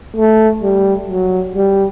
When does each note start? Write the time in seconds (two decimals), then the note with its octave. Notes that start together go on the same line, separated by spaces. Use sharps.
0.16 A3
0.63 G3
1.09 F#3
1.55 G3